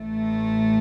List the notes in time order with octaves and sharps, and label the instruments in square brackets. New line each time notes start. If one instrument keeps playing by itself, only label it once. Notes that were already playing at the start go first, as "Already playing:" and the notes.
Already playing: [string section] A1 A2 A3